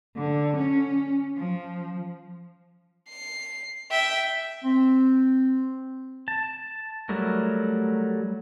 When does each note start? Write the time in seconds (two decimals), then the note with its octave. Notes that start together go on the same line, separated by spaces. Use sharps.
0.17 D3
0.57 C#4
1.38 F3
3.09 C7
3.91 E5 G5
4.64 C4
6.28 A5
7.09 F#3 G3 A3 A#4